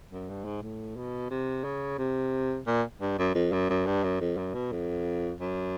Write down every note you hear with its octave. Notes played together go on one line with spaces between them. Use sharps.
F#2
G2
G#2
A2
B2
C3
C#3
C3
A#2
G2
F#2
F2
F#2
F#2
G2
F#2
F2
F#2
B2
F2
F#2